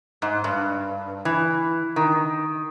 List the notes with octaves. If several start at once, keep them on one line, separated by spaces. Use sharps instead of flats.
G#2
G2
E3
D#3